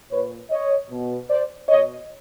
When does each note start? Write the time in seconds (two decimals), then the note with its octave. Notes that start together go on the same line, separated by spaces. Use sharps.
0.11 A#2 B4 C#5
0.50 C#5 D#5
0.90 B2
1.29 C5 D5
1.68 B2 C#5 D#5